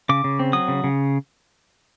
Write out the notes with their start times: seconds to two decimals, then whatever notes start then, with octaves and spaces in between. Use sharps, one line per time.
0.09 C#3 D6
0.24 C#3
0.39 C4
0.53 F#3 D#6
0.68 C#3
0.84 C#3